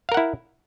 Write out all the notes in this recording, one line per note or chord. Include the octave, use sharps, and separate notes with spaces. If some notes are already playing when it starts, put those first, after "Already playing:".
E4 A#4 F5 F#5